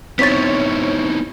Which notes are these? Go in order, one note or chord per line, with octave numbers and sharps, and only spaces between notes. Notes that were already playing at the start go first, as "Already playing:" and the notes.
B3 C4 D#4 E4 C#5 A6 B6